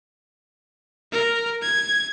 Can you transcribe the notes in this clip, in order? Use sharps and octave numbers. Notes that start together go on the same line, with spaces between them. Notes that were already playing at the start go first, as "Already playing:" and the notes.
A#4
G#6